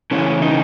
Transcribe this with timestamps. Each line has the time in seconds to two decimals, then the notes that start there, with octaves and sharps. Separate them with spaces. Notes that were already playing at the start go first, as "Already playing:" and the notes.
0.11 C#3 E3 A3 C#4
0.42 D#4